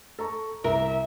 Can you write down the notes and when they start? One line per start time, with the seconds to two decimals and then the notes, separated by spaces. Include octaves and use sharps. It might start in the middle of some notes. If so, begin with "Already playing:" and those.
0.19 A4 A#5 C#6
0.64 C2 A#4 E5